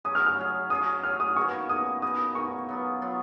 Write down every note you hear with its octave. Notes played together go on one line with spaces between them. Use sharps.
F#3 C#4 G#4 D#6
F6
F6
F#3 C#4 G#4
F#3 C#4 G#4 D#6
F#3 C#4 G#4 F6
D#6
B2 A#3 D#4 G#4 C#6
B2 A#3 D#4 G#4 D#6
B2 A#3 D#4 G#4 D#6
B2 A#3 D#4 G#4 C#6
F#3 B3 F4
F#3 B3 F4